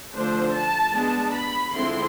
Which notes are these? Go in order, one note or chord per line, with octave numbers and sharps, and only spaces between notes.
D3 F3 A3 D4 C5
A5
G#3 B3 D4 A5
B5
D3 F3 G#3 C4 E4 C6